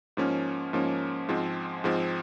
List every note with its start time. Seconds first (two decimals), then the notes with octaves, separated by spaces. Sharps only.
0.17 G#2 F3 A#3 C#4
0.73 G#2 F3 A#3 C#4
1.29 G#2 F3 G#3 C4
1.84 G#2 F3 G#3 C4